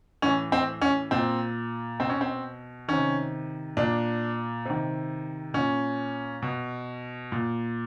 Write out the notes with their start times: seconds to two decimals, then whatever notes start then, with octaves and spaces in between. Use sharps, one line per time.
0.22 A2 E3 C#4
0.52 C4
0.82 C#4
1.11 A#2 C4
2.00 B2 C4
2.10 C#4
2.21 C4
2.88 C3 D#3 C#4
3.77 A#2 D4
4.65 C3 D#3
5.54 A#2 C#4
6.42 B2
7.32 A#2